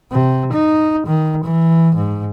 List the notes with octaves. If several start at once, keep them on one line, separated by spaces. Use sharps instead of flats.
C3
D#4
D#3
E3
G#2